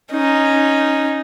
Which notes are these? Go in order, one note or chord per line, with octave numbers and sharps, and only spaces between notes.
C#4 D#4